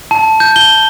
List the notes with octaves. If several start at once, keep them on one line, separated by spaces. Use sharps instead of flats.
A5
G6
G7